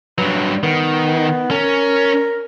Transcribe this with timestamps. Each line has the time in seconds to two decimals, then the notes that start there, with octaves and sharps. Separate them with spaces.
0.18 G2 F#3 B4
0.63 D#3 B3
1.51 C#4 A#4